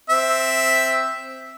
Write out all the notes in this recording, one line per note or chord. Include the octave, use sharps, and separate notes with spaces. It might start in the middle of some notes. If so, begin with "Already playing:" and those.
C4 E5